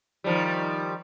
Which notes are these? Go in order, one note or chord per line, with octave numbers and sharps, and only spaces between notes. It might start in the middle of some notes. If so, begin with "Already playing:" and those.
D#3 F3 G3